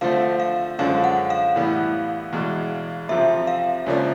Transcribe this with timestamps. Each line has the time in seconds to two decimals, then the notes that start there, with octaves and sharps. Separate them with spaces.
0.01 D3 F3 A3 C4 F5
0.40 F5
0.79 F#2 D3 F3 G#3 F5
1.04 F#5
1.30 F5
1.56 A2 E3 G3 B3
2.32 E2 B2 G#3
3.09 F2 C3 F3 E5
3.47 F5
3.86 C#2 C#3 F3 A#3 D4